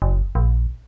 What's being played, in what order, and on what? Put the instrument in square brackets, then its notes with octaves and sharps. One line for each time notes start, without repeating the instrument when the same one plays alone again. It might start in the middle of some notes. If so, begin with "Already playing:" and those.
[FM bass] F#1
A#1